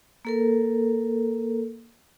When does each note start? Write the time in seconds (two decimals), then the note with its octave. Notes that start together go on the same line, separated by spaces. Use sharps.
0.25 A#3 A4 A#4